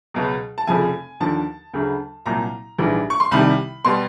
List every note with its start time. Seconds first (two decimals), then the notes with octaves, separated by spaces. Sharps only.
0.14 C#2 B2 F#3
0.58 A5
0.67 F1 F2 C#3 F3 G#5
1.20 D#2 D3 F3 A5
1.74 D2 C#3 F#3
2.26 C2 A#2 F#3 A#5
2.79 A#1 G#2 E3 G3
3.10 C#6
3.20 C6
3.31 C2 C3 D#3 G3 B5
3.85 B2 G3 C6